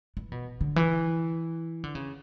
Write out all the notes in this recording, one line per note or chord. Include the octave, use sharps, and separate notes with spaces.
E3
B2
D3
E3
D3
C#3